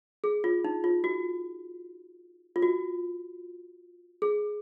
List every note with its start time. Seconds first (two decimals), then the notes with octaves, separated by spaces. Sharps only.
0.24 G#4
0.44 F4
0.64 D#4
0.84 F4
1.04 F#4
2.56 F4
2.62 F#4
4.22 G#4